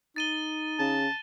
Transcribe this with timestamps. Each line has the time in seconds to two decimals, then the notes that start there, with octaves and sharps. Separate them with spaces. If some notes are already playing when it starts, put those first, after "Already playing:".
0.16 D#4 A6 D#7 G7
0.79 C#3 A5